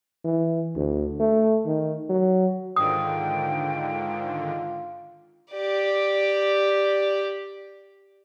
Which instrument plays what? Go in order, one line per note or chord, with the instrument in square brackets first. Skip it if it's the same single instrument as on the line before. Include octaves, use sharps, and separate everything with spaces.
[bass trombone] E3
D2
A3
D#3
F#3
[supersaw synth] G#2 D3 D#3 [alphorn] F4 [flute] G5 [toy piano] D#6
[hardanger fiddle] G4 D5